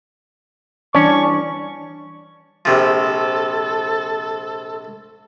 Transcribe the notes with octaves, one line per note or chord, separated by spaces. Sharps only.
E3 G3 C#4 D4 D5 A5 C#6
A#1 C3 F3 A4